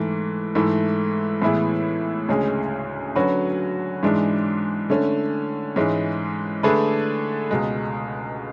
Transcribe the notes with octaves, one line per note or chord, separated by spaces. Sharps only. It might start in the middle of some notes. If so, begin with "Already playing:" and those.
Already playing: G#2 E3 A3
G#2 E3 A3 E4
A2 E3 B3 E4 G#4
D2 C#3 G#3 C#4 G#4
D3 F#3 C#4 F#4 B4
G#2 E3 G#3 D4
D3 A3 C#4
G#2 E3 G#3 C#4
D3 A3 D4 G#4 B4
C#2 B2 G#3